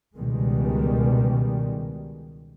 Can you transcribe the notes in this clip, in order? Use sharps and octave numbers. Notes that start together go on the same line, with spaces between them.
C#2 B2 D#3 G3 G#3